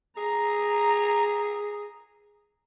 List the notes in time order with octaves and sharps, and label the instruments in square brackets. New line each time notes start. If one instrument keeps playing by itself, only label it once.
[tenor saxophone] G#4 [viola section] A#5